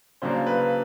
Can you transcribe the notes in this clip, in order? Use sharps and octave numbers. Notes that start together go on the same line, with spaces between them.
C#3 F#3 A#3 D4 C5
B4